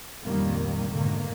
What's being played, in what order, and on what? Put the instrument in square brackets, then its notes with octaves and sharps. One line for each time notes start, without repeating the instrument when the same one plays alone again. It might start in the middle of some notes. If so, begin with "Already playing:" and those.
[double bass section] F1 C#2 A#2 D#3 G3 A#3
G#2 B2 D3 D#3 A#3